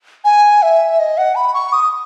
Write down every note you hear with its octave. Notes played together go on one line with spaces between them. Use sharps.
G#5
E5
D#5
F#5
B5
C#6
D#6